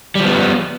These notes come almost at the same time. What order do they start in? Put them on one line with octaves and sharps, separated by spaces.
G3 F3 B3